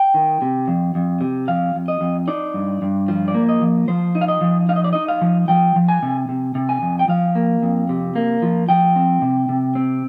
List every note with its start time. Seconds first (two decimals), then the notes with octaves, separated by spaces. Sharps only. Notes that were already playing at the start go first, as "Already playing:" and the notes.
Already playing: G5
0.14 D#3
0.42 C3
0.68 F2
0.95 F2
1.21 C3
1.48 F2 F5
1.75 F2
1.88 D#5
2.01 F2
2.28 D#4 D5
2.54 G2
2.82 G2
3.08 F3
3.28 D5
3.34 A#3
3.49 D#5
3.62 F3
3.88 F3 C5
4.15 D#4
4.21 F5
4.28 D#5
4.41 F3
4.69 D#4 F5
4.76 D#5
4.84 D5
4.93 D#4 D#5
5.08 F5
5.21 F3
5.48 F3 G5
5.76 F3
5.88 G#5
6.03 C3
6.29 C3
6.55 C3
6.69 G#5
6.82 F2
6.99 G5
7.08 F3 F5
7.35 A#3
7.63 F2
7.89 C3
8.15 A#3
8.42 F3
8.69 F3 G5
8.96 C4
9.22 C3
9.49 C3
9.75 C4